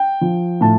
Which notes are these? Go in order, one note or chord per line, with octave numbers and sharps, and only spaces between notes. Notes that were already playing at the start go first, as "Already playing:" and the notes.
Already playing: G5
F3
A2 A5